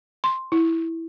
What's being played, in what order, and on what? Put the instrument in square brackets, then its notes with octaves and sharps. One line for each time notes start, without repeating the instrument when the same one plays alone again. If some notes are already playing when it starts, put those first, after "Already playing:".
[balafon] C6
E4